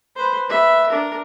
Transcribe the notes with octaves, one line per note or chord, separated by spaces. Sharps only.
B4 C5
B4 E5
D4 A#4